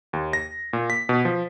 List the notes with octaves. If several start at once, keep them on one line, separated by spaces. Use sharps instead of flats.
D#2
A#6
A#2
B6
B2
F3